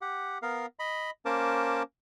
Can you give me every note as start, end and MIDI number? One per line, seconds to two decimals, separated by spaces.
0.01 0.38 67
0.01 0.38 78
0.42 0.66 59
0.42 0.66 70
0.42 0.66 77
0.79 1.10 75
0.79 1.10 83
1.25 1.83 58
1.25 1.83 61
1.25 1.83 70
1.25 1.83 72
1.25 1.83 81
1.25 1.83 86